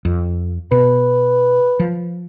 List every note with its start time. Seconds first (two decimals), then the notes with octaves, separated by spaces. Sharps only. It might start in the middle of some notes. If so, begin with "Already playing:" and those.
0.05 F2
0.71 B2 B4
1.80 F3